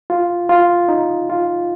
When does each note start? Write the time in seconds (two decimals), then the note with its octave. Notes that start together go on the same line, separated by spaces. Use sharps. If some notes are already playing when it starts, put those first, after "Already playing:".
0.10 F4
0.49 F4
0.89 D#4
1.29 F4